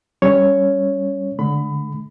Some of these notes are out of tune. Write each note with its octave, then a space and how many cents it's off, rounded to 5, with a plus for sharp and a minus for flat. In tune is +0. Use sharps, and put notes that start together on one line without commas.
G3 +0 C#4 +5 C#5 +0
D3 -10 G#3 +45 B5 +25